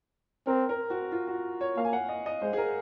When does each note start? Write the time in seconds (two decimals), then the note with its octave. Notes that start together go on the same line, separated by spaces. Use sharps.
0.47 C4 A#4
0.69 A#4
0.90 F#4
1.12 F4
1.27 F#4
1.61 C#5
1.77 A#3 F5
1.85 G#5
1.93 F#5
2.09 D#5
2.26 D#5
2.42 G#3 C5
2.53 G#4
2.57 A#4